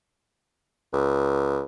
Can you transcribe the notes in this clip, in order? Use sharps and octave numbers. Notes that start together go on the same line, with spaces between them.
C#2